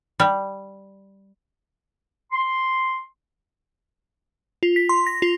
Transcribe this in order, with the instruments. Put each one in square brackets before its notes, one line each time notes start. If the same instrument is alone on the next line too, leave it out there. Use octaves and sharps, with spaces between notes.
[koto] G3
[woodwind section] C6
[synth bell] F4
B6
C6
A#6
F4